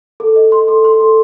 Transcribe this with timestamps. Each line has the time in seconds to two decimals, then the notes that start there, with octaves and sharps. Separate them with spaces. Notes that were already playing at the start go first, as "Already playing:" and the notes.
0.20 A4
0.36 D#5
0.52 C6
0.68 A4
0.84 C6
1.01 A4